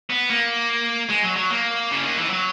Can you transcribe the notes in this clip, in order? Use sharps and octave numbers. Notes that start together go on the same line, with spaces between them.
B3
A#3
G#3
F#3
F#3
A#3
C#3
D#3
E3
F#3